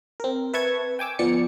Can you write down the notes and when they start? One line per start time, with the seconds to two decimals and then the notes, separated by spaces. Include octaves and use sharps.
0.20 C4 A#4
0.53 B4 E5 A5 C#6 G#6
0.99 G5 G#5 D6 E6
1.19 F3 B3 D5 C#7